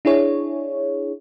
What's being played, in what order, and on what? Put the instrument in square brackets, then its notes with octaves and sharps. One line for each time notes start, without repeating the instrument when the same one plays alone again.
[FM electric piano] D4 E4 G#4 C#5